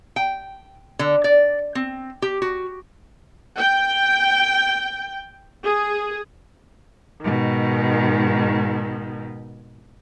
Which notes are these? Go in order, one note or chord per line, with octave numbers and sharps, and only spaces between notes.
G5
D3
D5
C4
G4
F#4
G5
G#4
G#2 B2 D#3